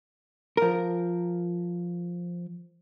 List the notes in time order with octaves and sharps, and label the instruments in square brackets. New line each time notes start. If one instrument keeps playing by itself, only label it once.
[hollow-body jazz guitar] F3 A#4